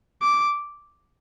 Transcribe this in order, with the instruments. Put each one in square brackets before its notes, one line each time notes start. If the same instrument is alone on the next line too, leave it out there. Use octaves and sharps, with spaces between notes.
[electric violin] D6